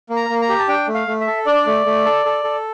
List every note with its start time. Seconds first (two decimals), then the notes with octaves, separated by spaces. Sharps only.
0.10 A#3
0.16 A#5
0.29 A#3
0.42 A#5
0.49 G4
0.59 A5
0.68 D4 G5
0.88 A3
0.94 F5
1.07 A3
1.20 E5
1.27 A4
1.46 D4 D5
1.67 A3
1.86 A3
2.05 A4
2.26 A4
2.44 A4